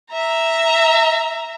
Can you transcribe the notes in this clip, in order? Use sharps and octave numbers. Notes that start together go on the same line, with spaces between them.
E5 A#5